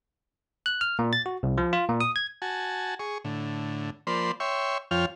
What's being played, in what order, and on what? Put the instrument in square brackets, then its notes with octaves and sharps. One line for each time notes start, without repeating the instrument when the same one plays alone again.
[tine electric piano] F#6
F6
A#2
A6
F#4
C2
F3
F4
A#2
D#6
G#6
[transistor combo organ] F#4 G#5 A5
G#4 C#6
A2 D3
F3 A#3 C5 D5 B5 C6
C#5 E5 G5 C6 C#6
F2 F3 F4 C#5 G5 F6